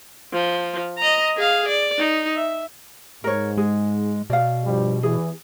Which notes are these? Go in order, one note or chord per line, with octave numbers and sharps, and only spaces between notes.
F3
D#5 A#5
G#4 F5
D5
D#4
E5
G#2 A#4 C#5
G#3 G#4
B2 D5 F5
G2 F3 G3
E2 E3 G#4